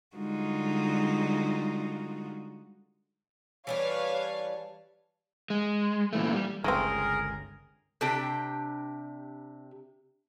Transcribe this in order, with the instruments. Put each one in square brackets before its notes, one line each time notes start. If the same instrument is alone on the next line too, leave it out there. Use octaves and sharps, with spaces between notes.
[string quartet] D3 G3 G#3 D#4 F4 F#4
[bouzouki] E3 G3 D4 [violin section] B4 C#5 F5
[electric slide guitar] G#3
A#2 E3 A3
G3
[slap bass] G1 C#2 D3 [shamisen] A3 C4 [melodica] G#4 [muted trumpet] A#4
[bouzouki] C3 D4 G4 G5